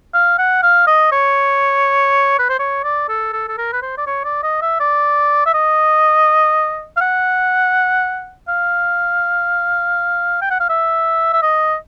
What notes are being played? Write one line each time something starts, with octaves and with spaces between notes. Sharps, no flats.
F5
F#5
F5
D#5
C#5
B4
C5
C#5
D5
A4
A4
A4
A#4
B4
C5
D5
C#5
D5
D#5
E5
D5
E5
D#5
F5
F#5
F5
G5
F#5
F5
E5
E5
D#5